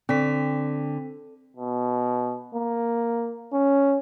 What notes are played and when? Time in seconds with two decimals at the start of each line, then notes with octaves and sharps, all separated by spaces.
0.09 D3 C4 B6
1.57 B2
2.55 A#3
3.53 C#4